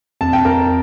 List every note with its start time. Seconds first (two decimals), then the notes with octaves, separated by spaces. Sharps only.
0.21 F2 A5
0.33 G5
0.45 F2 A#4